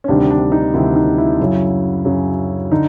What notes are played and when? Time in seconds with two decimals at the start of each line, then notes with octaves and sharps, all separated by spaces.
0.04 C#4
0.08 D2 C3 D#3 G3 D4
0.30 D4
0.52 D#4
0.74 D2 C3 D#3 G3 E4
0.96 D#4
1.18 E4
1.39 F#2 C#3 F#3
2.05 F#2 C#3 F#3
2.72 D3 D#4